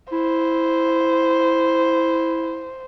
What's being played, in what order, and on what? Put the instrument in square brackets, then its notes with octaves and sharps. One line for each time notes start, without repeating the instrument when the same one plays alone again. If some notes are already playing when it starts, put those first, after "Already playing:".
[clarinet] E4 [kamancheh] C5